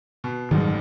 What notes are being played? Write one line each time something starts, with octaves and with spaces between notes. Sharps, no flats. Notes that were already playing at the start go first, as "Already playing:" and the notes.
B2
F#1 G#2 D#3 F#3 G3